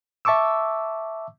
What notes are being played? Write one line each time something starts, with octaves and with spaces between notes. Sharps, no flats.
E5 A5 C#6 D6 E6